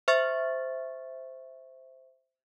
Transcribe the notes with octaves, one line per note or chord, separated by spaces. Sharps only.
C5 E5 C#6 A6